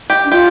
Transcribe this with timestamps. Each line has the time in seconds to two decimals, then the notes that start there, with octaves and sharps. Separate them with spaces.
0.10 G4
0.25 D4
0.32 F4 G4